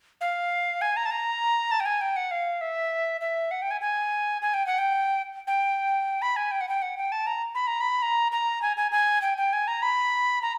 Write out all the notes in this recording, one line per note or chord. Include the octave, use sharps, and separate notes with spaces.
F5
G#5
A#5
A5
A#5
A5
G5
G#5
G5
F#5
F5
E5
E5
F#5
G5
G#5
G#5
G#5
G5
F#5
G5
G5
B5
G#5
G5
F#5
G5
F#5
G5
A5
A#5
B5
A#5
B5
A#5
A#5
G#5
G#5
G#5
G5
G5
G#5
A#5
B5
A#5